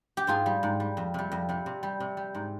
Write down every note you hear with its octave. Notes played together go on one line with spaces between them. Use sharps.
G4
G#2 F4 G#4
G3
G#2
G3
F2
C3 G3
F2
C3 G3
C3
G3
C3
G3
G#2